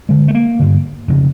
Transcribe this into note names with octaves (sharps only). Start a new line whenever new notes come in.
G2 D3 G#3
A3
A#3
G2 D3
F2 C#3